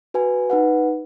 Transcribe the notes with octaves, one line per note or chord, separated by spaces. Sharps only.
F#4 B4 G#5
D#4 B4 F#5